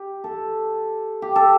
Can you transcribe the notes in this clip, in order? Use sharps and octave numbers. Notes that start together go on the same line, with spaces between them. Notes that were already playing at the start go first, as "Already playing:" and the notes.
Already playing: G4
A4
G4
A4